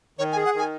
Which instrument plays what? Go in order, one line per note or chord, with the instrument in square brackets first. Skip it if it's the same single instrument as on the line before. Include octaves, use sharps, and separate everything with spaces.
[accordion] D#3 [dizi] C#5
[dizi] G#5
[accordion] G#4
[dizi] F#5
[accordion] D#3 [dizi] G#5